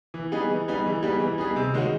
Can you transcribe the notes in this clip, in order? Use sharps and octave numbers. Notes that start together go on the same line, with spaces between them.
E3
G3 B3 D#4 G#4
E3
G3 B3 D#4 G#4
E3
G3 B3 D#4 G#4
E3
G3 B3 D#4 G#4
C3
D#3 G#3 C#4 F#4